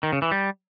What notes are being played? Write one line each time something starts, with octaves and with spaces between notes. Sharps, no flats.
D#3
C#3
E3
G3